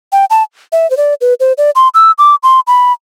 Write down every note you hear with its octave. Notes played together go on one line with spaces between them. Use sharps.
G5
A5
E5
C5
D5
B4
C5
D5
C6
E6
D6
C6
B5